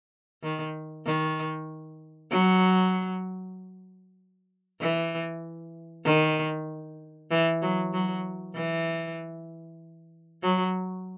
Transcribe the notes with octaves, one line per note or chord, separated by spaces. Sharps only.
D#3
D#3
F#3
E3
D#3
E3
F#3
F#3
E3
F#3